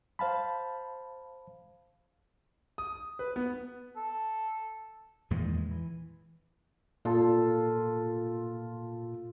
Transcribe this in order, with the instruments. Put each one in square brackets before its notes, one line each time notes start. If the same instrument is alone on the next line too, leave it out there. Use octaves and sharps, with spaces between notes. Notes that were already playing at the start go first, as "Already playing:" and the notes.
[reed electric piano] C5 F5 A5 B5
[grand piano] D#6
B4
B3
[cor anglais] A4
[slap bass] E2 A#2 D#3 G#3
E3
[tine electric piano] A#2 [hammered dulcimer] F4 A4